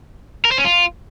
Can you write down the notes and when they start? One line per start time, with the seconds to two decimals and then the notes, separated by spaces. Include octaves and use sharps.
0.45 A#4
0.52 C5
0.58 C#4
0.65 F4